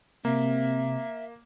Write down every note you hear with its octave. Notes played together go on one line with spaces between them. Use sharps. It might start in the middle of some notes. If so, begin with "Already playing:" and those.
C3 A#3 C4 E5